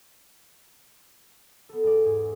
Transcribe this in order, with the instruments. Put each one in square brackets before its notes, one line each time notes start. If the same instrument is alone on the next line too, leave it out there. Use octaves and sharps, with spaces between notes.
[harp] B3 A4
E2 D5
G#2 G#4